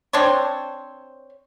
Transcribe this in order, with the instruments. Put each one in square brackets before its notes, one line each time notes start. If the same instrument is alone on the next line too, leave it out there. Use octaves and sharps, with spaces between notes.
[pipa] C4 D4 C5 C#5